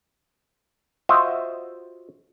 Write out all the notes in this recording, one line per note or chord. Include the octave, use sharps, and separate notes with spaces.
F4 F#4 C5 D#5 E5